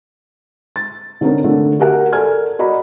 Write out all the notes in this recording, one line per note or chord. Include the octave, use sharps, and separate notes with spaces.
A6
D3 C4 C#4 D#4 A#4
D3 A3
F#4 G4 A#4 F#5
A4 A#4 D5 G#5 F6 G#6
F#4 D5 D#5 A#5 B5